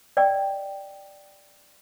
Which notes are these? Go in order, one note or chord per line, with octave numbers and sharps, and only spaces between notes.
D5 D#5 G5